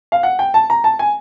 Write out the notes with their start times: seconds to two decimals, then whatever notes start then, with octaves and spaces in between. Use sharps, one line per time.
0.12 F5
0.23 F#5
0.39 G5
0.54 A5
0.70 A#5
0.84 A5
0.99 G#5